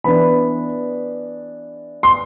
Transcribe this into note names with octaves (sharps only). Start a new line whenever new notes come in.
E3 B3 D4 B5
C6